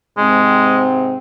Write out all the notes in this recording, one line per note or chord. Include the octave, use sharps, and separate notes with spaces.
G#2 C3 G#3 C4